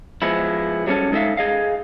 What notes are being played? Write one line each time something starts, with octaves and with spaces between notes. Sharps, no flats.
F3 G#3 B3 E4
F#3 G3 A3 A#3 C#4 A4
G#3 D#4 A4 A#4 E5 F5
G#4 D#5 F5